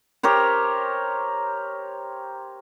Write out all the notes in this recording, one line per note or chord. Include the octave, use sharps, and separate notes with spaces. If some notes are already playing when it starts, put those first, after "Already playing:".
G4 A#4 C5 C#5